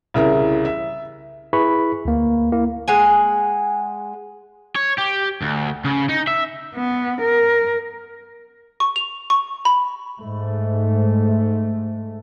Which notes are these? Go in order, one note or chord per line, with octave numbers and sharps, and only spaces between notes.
C2 C#3 E4 A#4
E5
E4 G#4 B4 B5 C#6
D2 A#3
A#3 E4
G#3 F#5 G#5
C#5
G4
D2
C#3
D#4
E5
B3
A#4
C#6
F7
C#6
B5
G#2 A3